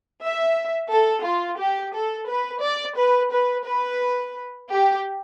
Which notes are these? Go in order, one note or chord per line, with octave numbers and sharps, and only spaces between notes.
E5
A4
F4
G4
A4
B4
D5
B4
B4
B4
G4